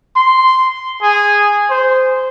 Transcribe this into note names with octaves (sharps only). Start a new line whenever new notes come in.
C6
G#4
C5